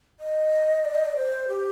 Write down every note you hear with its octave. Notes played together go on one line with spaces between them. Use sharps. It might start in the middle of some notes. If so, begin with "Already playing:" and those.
D#5
D5
D#5
D5
C5
G4